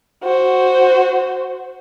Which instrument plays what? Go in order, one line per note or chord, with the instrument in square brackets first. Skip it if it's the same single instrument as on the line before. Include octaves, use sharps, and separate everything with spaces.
[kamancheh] F#4 C5